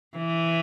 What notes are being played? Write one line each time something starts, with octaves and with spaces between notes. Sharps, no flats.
E3